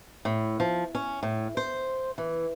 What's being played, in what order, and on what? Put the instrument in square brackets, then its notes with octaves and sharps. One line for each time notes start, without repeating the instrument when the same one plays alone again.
[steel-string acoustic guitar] A2
F3
C#4
A2
C5
E3